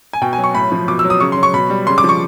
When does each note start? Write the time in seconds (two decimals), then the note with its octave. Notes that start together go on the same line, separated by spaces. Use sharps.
0.13 G#5
0.22 B2 G5
0.33 G#5
0.38 F#3
0.44 C#6
0.54 A2 B5
0.72 F3
0.88 B2 D6
0.99 E6
1.05 F#3
1.10 D#6
1.20 C#3 C#6
1.32 C6
1.37 F#3
1.43 C#6
1.54 B2 B5
1.70 G3
1.87 C#3 C6
1.98 D6
2.04 F3 C#6